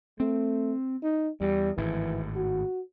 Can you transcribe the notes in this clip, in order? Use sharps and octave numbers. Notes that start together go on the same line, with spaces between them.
A3 C4
D#4
E2 G3
G#1 A2 E3
F#4